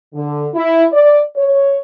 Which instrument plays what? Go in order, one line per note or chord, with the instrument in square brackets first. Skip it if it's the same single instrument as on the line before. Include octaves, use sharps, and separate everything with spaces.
[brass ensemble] D3
E4
D5
C#5